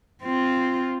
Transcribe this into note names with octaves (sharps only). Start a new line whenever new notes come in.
C4 F4